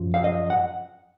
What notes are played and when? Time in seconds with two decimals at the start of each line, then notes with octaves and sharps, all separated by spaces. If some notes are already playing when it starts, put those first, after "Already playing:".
Already playing: F#2 F3
0.14 F5
0.24 D#5
0.50 F#5